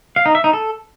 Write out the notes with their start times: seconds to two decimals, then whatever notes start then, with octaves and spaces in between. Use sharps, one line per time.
0.16 F5
0.26 D#4
0.35 E5
0.44 D#4
0.53 A4